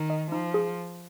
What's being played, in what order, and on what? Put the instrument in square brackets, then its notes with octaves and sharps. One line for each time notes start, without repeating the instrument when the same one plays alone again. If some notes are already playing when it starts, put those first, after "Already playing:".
Already playing: [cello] D#3
[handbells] D#5
[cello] F3 [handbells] D#4
[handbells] G#4